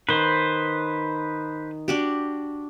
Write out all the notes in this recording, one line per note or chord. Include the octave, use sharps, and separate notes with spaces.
D#3 B4 C5
D4 F#4 G4